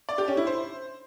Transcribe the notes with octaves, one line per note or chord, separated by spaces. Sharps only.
D5
G4
C#4
E4
C5